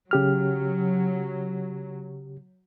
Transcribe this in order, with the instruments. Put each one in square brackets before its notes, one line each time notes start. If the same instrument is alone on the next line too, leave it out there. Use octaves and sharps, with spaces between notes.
[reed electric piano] C#3 G4 F6 [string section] F#3